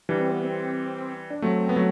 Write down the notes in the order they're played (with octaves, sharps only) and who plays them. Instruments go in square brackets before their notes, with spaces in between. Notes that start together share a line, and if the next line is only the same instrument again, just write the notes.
[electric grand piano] E3 G3 [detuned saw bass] D4
[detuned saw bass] C4
B3
C4
D4
[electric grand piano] F#3 A3 [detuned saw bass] C4
[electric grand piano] B3
F#3 A3